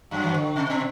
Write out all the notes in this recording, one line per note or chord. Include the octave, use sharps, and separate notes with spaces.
F#2 F#3
E3
D3
C3
B2